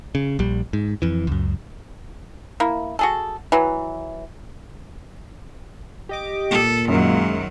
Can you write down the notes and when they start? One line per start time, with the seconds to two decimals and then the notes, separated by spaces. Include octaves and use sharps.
0.15 C#3
0.39 A#1 G3
0.73 G#2
1.02 F2 E3
1.27 C#2 F#2
2.60 A#3 E4
2.99 F#4 G#4 A4
3.52 E3 F#3
6.09 G4 D#5 D6
6.51 A#2 A4
6.88 F#2 D#3 F#3 G#3 A#3